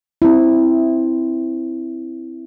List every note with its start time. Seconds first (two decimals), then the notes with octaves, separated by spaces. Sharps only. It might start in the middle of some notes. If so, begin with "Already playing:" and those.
0.22 C4 E4